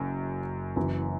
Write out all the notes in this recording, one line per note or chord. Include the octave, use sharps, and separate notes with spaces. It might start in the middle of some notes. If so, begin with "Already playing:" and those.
Already playing: F#1 F#2
F#1 F#2 E3